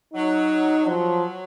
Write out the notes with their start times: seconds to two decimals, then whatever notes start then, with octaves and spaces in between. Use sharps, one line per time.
0.13 F#3 D#4
0.86 F3 F#3